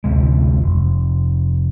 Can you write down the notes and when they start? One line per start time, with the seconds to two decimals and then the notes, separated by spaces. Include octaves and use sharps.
0.04 A1 D2 C3 G#3
0.64 F1